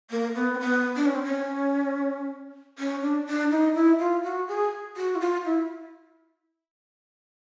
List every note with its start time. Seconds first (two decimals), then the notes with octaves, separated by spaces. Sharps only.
0.11 A#3
0.35 B3
0.55 C4
0.60 B3
0.96 D4
1.06 C#4
1.15 C4
1.24 C#4
2.79 C#4
3.02 D4
3.27 D4
3.51 D#4
3.75 E4
3.99 F4
4.23 F#4
4.48 G#4
4.97 F#4
5.16 E4
5.20 F4
5.45 E4